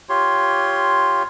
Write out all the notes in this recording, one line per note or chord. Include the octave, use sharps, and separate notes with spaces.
F4 G4 C#5 C6